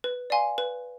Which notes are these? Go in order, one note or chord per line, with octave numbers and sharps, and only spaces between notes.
B4
D5 F5 G#5 C6
B4